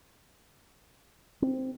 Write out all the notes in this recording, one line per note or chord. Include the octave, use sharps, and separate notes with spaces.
C4